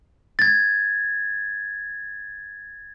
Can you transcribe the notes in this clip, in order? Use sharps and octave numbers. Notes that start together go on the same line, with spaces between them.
G#6 A6